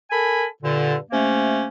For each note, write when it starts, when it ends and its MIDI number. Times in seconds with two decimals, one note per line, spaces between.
0.11 0.45 69
0.11 0.45 70
0.11 0.45 80
0.11 0.45 83
0.62 0.96 43
0.62 0.96 46
0.62 0.96 50
1.11 1.66 48
1.11 1.66 57
1.11 1.66 58
1.11 1.66 61